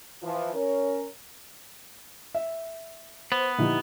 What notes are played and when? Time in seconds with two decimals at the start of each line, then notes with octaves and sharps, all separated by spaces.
0.23 E3 F3
0.54 C#4 A#4 C#5
2.34 E5
3.32 B3 C5
3.59 A#2 D3 F3 D#4 E4 G4